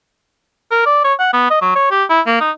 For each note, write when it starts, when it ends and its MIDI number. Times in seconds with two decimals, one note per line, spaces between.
0.71 0.85 70
0.86 1.00 74
1.04 1.13 73
1.19 1.32 78
1.33 1.50 59
1.50 1.58 75
1.61 1.71 54
1.75 1.90 73
1.91 2.04 67
2.09 2.20 64
2.26 2.37 58
2.40 2.51 63